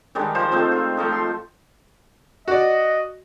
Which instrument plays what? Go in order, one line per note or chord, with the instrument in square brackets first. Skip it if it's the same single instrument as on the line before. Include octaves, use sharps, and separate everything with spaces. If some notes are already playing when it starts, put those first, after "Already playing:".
[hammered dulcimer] D#3 G3 G#3 D4
F3 F4 C5
A3 C4 D#4 F4
F4
F3 A3 D#4
C6
[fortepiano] F#4 D5 [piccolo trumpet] D#5